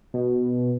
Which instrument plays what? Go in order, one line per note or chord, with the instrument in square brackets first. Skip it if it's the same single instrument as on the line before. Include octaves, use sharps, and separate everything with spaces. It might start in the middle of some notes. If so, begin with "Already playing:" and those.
[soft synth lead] B2